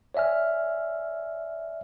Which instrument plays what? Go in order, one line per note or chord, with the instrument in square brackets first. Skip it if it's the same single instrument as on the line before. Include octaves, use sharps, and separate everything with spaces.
[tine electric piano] C#5 D5 E5 G#5 F6